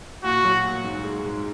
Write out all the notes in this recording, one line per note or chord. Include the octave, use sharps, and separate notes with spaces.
A#2 F#4
F#3
A#2
G#2
G#3
G#2